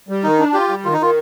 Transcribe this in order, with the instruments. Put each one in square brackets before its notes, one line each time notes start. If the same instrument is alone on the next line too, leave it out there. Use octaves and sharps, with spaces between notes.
[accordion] G3
[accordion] D#3 [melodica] D#4
[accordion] D4
[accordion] F4 [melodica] G4
[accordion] G3
[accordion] D#3 [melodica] F4
[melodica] D#4
[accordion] D#3 [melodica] F4